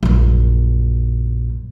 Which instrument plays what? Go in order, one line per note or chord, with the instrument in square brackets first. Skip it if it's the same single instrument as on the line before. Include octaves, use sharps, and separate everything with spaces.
[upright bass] A#1 F#2